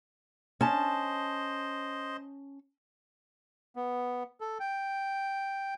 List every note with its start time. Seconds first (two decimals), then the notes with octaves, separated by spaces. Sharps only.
0.61 C#4 C5 D#5 A5
3.76 B3
4.41 A4
4.60 G5